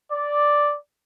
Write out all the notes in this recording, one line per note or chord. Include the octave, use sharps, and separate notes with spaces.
D5